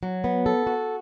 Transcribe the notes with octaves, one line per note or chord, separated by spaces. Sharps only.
F#3
B3
A4
F#4